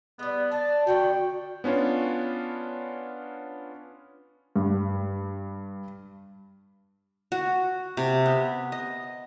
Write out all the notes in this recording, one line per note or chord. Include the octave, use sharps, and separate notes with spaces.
G3 G#3 B3
D4 A5
D3 D#3 B3 F#4 G5
B3 C#4 D4 F4 C#5
G2
F#4
C3
B3
D#5